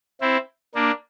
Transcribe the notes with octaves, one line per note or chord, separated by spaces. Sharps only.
C4 E4
A#3 D4